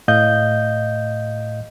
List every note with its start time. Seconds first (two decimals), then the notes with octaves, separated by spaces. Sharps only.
0.08 A2 D#5 F5 G6